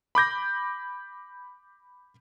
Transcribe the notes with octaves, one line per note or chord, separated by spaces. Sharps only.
B5 D6 G6 A#6